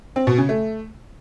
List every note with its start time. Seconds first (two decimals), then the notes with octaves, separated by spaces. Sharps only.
0.16 C4
0.27 B2
0.38 C#3
0.49 A3